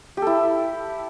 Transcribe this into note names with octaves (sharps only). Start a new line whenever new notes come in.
E4 G4 A4